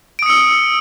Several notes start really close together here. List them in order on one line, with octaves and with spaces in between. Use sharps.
D7 D#6 C#7 E6